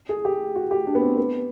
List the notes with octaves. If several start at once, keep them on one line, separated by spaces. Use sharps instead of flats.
G#4
G4
F#4
G4
D4
B3
C4
B3